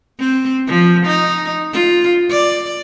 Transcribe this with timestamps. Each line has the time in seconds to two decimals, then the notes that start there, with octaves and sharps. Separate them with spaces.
0.19 C4
0.67 F3
1.06 D#4
1.73 F4
2.30 D5